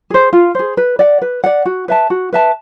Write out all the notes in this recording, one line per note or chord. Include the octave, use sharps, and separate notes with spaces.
G#4 C5
F4
G#4 C5
B4
D5 F#5
B4
D5 F#5
F#4
B4 E5 A5
F#4
B4 E5 A5